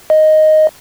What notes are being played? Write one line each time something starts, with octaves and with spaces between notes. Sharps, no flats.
D#5